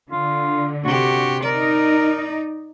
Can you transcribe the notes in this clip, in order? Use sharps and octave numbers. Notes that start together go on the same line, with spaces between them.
D3 F4
C3 F#4 G4
D#4 A#4 D5